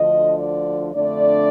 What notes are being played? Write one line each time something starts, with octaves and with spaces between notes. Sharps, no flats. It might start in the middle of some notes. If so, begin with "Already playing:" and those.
Already playing: D2 D3 F3 D#5
D5
F2 D3 A3 D4 D5